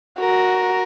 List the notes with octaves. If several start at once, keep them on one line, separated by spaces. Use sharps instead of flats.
F#4 A#4